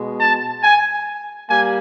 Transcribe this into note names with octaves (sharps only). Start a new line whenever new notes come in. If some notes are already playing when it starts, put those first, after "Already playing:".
Already playing: B2 G#3
A5
G#5
G3 A#3 G#5